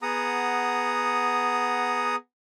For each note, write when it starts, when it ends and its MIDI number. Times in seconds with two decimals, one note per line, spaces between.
0.02 2.16 59
0.02 2.16 68
0.02 2.16 78
0.02 2.16 82
0.02 2.16 87